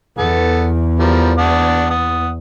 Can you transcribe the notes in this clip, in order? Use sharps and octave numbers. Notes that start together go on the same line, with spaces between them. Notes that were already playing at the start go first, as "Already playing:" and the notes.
E2 B3 A4
F3 G3 A#4
D4 F#5 D#6
F#5 D#6